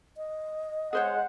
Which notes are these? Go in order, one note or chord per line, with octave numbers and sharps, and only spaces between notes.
D#5
G#3 G#4 C5 C#5 F#5